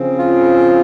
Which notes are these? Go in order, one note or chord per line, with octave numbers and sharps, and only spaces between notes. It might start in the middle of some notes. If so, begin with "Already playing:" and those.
Already playing: C#3 F3 C4
F4